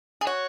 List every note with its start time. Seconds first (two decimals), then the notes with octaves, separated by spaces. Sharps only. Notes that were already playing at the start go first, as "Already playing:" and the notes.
0.21 G#4
0.27 F#4 C#5